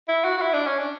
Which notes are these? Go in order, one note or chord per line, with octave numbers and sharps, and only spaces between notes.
E4
F#4
F#4
E4
D4
C#4
D4